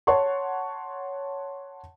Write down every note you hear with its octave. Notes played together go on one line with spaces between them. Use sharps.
C#5 F#5 A5 C6 C#6